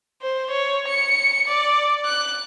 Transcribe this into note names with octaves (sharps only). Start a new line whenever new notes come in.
C5
C#5
C#7
D5
F#6